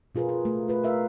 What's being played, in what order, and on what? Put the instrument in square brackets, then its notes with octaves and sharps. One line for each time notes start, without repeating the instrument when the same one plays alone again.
[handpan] B2 F4 G#4 A#4 B4
G#4
A3
F4 B4
A#4 E5 F5